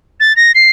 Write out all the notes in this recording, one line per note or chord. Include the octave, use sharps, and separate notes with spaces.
A6
A#6
C7